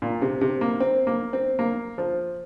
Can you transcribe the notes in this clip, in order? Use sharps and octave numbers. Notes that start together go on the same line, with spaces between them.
A#2
C3
C3
A#3
C4
A#3
C4
A#3
F3